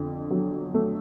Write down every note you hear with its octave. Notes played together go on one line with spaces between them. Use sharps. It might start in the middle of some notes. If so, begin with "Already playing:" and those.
Already playing: F2 D3
F#3
A3